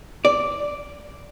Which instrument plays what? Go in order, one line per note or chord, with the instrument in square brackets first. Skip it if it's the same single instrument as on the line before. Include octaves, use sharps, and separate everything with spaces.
[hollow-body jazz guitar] D5